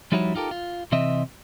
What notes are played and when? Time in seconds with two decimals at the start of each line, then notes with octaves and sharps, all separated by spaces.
0.12 F3 G3 D#4 E4 F#4 C#5
0.35 D#4 F4 G4 A4 A#4
0.51 F4
0.92 C3 E3 C4 D#5 E5